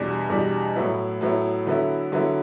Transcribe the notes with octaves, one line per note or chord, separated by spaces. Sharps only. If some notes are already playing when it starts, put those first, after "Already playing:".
Already playing: E2 B2 G3 D4
E2 B2 G3 D4
A2 F#3 B3 E4
A2 F#3 B3 E4
D3 F#3 B3 E4
D3 F#3 B3 E4